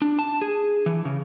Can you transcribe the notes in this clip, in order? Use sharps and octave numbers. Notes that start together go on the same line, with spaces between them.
D4
A5
G#4
E3
C#3